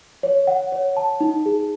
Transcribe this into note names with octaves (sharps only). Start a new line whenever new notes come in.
C#5
F#5
C#5
A5
D#4
G#4